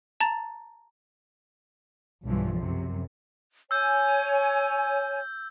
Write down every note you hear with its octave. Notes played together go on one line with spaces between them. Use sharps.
A5 A#5 A6
B1 G2 E3 F3
F#2 C3
C#5 G#5 E6 G6